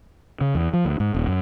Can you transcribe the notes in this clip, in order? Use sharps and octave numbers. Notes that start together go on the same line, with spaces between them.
C#3
E2
F3
D2
G#2
D#1
F#2